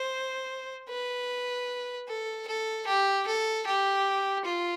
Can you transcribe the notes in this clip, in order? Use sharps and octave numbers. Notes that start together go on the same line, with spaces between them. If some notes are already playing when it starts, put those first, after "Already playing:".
Already playing: C5
B4
A4
A4
G4
A4
G4
F4